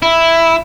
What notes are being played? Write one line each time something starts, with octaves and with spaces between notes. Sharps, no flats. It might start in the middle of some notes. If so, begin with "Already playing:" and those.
E4